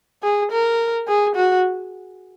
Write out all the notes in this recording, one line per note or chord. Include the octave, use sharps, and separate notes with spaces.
G#4
A#4
G#4
F#4